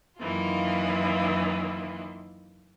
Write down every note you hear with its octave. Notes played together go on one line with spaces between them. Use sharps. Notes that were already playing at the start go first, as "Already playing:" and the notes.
F#2 D#3 E3 A#3 F4